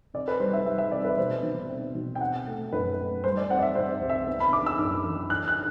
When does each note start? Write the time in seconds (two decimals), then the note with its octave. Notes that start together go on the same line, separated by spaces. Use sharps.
0.14 C3 D5
0.28 B4
0.40 G3 C5
0.53 E5
0.66 G3 E5
0.78 E5
0.92 C3 D5
1.04 B4
1.18 B2 C5
1.43 B2
1.69 C4
1.95 B2
2.15 G5
2.20 C4 F#5
2.47 A3
2.73 F#2 B4
2.98 A3
3.24 G3 C5
3.37 D5
3.49 C4 F#5
3.59 D5
3.63 E5
3.75 C3 C5
4.01 C2
4.09 E5
4.27 B3
4.40 B5
4.52 D4 D6
4.66 E6
4.79 F#2
5.05 E3
5.30 D4 F#6
5.48 F#6